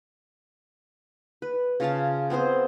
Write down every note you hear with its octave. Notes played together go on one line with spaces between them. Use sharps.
B4
C#3 F4 F5 A5
B3 C4 G#4 C5